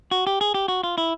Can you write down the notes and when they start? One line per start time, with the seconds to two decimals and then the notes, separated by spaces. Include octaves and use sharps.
0.11 F#4
0.27 G4
0.41 G#4
0.54 G4
0.68 F#4
0.83 F4
0.98 E4